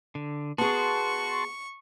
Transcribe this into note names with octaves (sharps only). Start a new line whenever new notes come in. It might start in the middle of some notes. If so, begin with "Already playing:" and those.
D3
B3 F#4 G#4 A5 C6 C#6